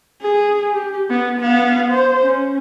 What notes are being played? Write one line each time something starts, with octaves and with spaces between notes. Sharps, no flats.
G#4
G4
B3
B3 F5
C5
C#4